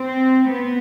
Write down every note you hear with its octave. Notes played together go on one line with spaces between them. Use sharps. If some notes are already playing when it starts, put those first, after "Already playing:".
Already playing: C4
B3